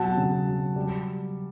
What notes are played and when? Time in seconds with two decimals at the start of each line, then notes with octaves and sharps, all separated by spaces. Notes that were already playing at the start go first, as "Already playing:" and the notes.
Already playing: B2 F#3 F#5 A5
0.17 C#3
0.47 F#3
0.76 G3